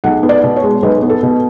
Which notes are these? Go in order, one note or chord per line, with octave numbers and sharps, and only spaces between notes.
B1 F#5
B3
D5
B2
C#5
G#3
B1 B4
B3
A4
B2